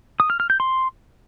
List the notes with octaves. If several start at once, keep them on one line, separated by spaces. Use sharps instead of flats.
D#6
F6
F6
G6
C6